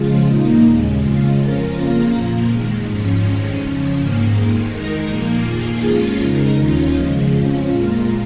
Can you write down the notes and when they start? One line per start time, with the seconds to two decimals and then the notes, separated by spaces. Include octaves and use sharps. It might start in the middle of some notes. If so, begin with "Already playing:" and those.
Already playing: C#3 F3 G#3 F4
0.27 A#2 A#3 D#4
0.63 D#2 C#3 G#3
1.00 F2 C#3 G#3 F4
1.38 F3 C#4 F4 A#4
1.75 F2 C#3 A#3 F4 A#4
2.12 A#2 F3 A#3
2.49 F2 D#3 G#3
2.86 G#2 F3 C#4
3.23 F2 D#3 G#3 C#4
3.61 C#3 F3 C#4
3.98 G#2 D#3 A#3
4.34 F2 D#3 G#3
4.72 D#3 G#3 D#4 A#4
5.08 A#2 F3 A#3
5.46 F2 D#3 A#3 F4 G#4
5.83 F2 F3 G#3 C#4 F4
6.20 C#3 G#3 D#4 A#4
6.57 D#2 D#3 C#4 F4
6.94 C#3 F3 G#3
7.31 F2 F3 C#4 F4
7.69 A#2 G#3 F4 A#4